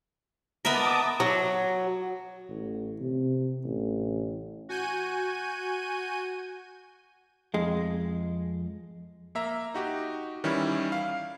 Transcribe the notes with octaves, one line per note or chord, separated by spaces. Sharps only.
B3 A#4 D#5 E5 A5 D6 D#6
F#3
A1
C3
A1
F#4 G#5 G6 D#7
F2 G#3
A#3 E5 A#5
D#4 F#4 G4
D#3 E3 G3 C#4 E4
F5